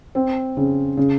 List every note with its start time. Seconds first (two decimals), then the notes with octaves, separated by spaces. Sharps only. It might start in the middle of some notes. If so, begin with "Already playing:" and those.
0.15 C4
0.57 C#3
0.97 C#3